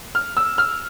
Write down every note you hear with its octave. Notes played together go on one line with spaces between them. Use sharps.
F6
E6
F6